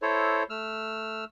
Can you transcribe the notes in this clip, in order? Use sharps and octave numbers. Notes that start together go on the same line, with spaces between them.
E4 A4 C5 C#5
A3 E6 F6